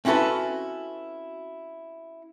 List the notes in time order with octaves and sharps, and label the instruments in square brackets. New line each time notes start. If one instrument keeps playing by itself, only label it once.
[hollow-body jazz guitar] C4 C#4 E4 F#4 A4 B4